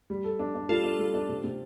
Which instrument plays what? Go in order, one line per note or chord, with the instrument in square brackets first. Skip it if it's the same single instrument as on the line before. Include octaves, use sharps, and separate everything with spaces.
[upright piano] G3
A4
D4
D4
[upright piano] G3 [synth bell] F4 A4
[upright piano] D4
G3
D4
C3
C3